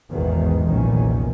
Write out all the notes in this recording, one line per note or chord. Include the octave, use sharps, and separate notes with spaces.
A1 E2 G#2 B2 D#3 E3
F1 B1 E2 A#2 D#3 C#4